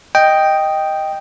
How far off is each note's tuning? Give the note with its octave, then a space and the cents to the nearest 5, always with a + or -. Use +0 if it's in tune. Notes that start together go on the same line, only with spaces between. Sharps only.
D#5 +0 G5 +0